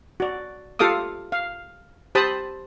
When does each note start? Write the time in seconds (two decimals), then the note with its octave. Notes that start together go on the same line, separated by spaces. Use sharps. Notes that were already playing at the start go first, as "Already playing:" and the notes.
0.20 F#4 D5
0.79 F4 G4 A4 F5 D6 D#6
1.32 F5
2.15 G4 C5 A5 B5 D#6